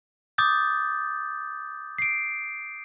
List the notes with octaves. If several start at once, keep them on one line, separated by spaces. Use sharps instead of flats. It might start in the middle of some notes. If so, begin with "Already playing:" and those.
D6 D#6 G6 A6
C7 D7